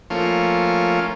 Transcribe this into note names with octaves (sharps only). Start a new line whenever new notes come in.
F3 A3 A#3 C#4 F4